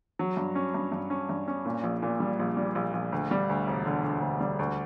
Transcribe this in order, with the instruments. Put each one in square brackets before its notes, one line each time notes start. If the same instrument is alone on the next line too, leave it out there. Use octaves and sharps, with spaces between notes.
[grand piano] F#3
G2
C#4
G2
G2
C#4
G2
C#4
A#2
A#1
A#2
G3
A#1
G3
A#1
A#1
D2
G3
D2
E1
D3
D3
D2
G3
D2